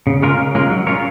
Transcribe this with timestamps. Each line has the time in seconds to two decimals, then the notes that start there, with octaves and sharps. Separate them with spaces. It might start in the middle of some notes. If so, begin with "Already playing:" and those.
0.07 C#3
0.22 G#3 C#4 F4 A#4
0.38 C#3
0.55 G#3 C#4 F4 A#4
0.70 F#3
0.87 C#4 F4 A#4 C#5